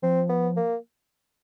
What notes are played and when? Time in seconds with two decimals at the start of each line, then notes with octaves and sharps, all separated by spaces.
0.02 F3 C4
0.29 B3
0.56 A#3